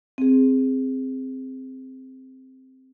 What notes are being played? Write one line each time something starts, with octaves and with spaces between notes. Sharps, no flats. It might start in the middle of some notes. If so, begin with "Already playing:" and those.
C4 G#4